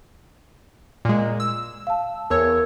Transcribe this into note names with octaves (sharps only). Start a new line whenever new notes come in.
A#2 G#3
E6
F5 A5
E2 A#4 C#5 E6 G#6